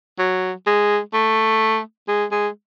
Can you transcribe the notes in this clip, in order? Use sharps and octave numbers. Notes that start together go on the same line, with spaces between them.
F#3
G#3
A3
G#3
G#3